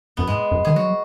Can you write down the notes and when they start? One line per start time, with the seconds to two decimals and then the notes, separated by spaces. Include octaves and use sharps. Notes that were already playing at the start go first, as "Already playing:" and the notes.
0.17 F#2 B3
0.27 G#2 G#3
0.52 F#2
0.65 D#3 G#4
0.76 F#3 F#4